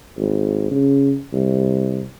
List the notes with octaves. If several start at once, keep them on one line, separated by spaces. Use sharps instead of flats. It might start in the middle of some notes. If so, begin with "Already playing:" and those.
G#1
C#3
C2